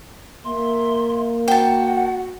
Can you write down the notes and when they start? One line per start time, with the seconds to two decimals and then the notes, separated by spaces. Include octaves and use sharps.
0.45 A#3 E5 C6
1.48 F#4 F#5 G5 A5